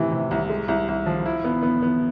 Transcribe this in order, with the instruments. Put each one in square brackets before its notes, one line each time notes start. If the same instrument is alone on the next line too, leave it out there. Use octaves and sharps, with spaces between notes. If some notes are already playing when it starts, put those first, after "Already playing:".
Already playing: [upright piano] A2 C3 E3
C3
C2
G#3
C2
C2
F3
E4
B3
B3
B3